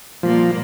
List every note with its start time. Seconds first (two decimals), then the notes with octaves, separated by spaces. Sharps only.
0.23 A#2 F3 G3 A#3